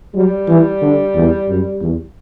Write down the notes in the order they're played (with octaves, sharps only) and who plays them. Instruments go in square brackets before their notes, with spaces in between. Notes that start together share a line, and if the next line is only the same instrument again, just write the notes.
[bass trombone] F#3 [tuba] G3
[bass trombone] E3
D3
E2
F#2
E2